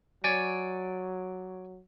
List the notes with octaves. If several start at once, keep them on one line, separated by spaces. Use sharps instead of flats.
F#3 C#5 D5 G#5